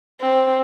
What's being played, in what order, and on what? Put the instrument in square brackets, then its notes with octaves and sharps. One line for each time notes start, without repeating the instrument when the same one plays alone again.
[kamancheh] C4